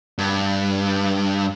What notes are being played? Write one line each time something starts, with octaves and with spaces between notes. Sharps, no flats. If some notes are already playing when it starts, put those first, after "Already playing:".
G2